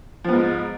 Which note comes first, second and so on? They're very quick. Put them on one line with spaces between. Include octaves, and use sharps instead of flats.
F3 B3 G#2